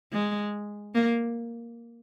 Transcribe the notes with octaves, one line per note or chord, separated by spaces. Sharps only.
G#3
A#3